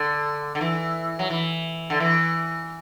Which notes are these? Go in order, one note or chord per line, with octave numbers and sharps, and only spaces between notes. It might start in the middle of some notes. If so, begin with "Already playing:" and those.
Already playing: D3
D3
E3
F#3
E3
D3
E3